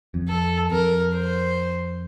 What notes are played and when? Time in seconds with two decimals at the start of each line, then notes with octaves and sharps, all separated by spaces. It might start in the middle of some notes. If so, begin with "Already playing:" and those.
0.14 F2
0.28 A4
0.71 F2 A#4
1.14 C5